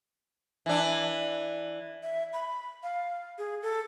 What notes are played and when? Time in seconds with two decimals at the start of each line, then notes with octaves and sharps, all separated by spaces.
0.66 E3 D4
2.03 E5
2.33 B5
2.83 F5
3.38 G#4
3.62 A4